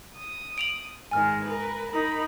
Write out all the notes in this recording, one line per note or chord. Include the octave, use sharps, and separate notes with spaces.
D#6
D7 F7 F#7
G#2 D#3 G#3 G#5 F6
A#4 B4
D#4 A#4 B5